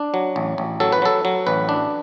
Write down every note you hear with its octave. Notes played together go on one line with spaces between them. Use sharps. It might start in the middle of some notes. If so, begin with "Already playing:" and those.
Already playing: D4
F#3
A1
A1
F#3 A4
B4
F#3 A4
F#3
A1 B4
D4